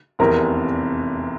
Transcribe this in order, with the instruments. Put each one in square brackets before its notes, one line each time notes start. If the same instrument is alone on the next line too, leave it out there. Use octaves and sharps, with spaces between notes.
[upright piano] F1 E2 C3 [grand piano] A#4